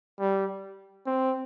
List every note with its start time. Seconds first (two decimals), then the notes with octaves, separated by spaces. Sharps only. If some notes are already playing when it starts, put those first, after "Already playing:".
0.19 G3
1.06 C4